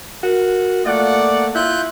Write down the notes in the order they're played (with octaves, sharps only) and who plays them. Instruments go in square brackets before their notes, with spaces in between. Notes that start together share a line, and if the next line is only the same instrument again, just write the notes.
[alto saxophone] F#4 [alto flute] A#4
[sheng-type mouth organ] A3 [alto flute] A#3 [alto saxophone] F4 [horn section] D5 F#5
[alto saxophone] E4 [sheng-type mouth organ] F4 F#6 G6